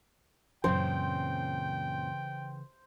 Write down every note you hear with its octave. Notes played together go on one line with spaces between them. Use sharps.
F#2 A#2 C#3 E3 C4 C5 G5